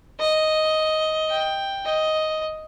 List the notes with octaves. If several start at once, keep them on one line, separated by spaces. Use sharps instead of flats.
D#5
G5
D#5